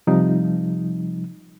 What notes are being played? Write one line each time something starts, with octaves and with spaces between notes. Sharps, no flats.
C3 F3 G3 D#4